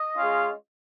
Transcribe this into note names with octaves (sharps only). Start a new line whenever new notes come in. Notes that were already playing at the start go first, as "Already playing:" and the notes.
Already playing: D#5
G#3 C#4 F4